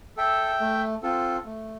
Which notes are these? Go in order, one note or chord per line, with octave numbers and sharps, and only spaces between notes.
A4 E5 G5
A3
C4 F4 A4
A3